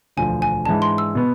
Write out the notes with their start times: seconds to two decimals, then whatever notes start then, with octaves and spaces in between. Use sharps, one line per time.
0.17 E1 D2 D3 F3 G#5
0.42 G#5
0.66 G#2 E3 G#3 D4 A5
0.82 C6
0.98 E6
1.15 B2 B3